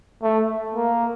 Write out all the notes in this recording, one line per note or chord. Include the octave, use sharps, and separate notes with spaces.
A3
A#3